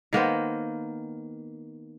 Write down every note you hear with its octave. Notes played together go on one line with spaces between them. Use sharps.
D#3 A#3 B3 C5